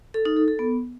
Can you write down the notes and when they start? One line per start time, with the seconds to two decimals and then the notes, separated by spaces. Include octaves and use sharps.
0.14 A4
0.25 D#4
0.37 A4
0.48 A4
0.59 B3